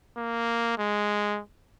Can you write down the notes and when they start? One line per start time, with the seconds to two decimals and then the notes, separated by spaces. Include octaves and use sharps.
0.17 A#3
0.78 G#3